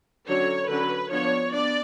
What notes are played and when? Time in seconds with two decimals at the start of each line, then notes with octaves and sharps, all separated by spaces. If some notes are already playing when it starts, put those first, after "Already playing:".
0.28 D3 F#3 C#4 C#5
0.69 D3 F#3 C#4 B4
1.10 F3 B3 D4 C#5
1.52 B3 D4 D5